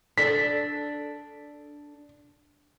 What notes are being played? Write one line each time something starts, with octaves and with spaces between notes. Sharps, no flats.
D4 A4 B6